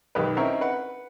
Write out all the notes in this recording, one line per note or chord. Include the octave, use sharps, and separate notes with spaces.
B1 D#3 G4 B4
C4 C#4 D#4 E4 A#4
B4 F#5